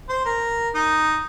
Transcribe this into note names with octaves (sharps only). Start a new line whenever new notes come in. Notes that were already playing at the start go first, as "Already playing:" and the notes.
C5
A#4
D#4